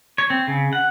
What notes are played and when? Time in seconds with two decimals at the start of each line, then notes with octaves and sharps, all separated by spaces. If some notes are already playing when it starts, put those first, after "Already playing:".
0.18 C#5
0.30 C4
0.47 C#3
0.73 F#5